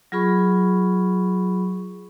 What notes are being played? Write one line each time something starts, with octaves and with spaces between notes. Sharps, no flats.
F#3 F4 G#4 B5 C#6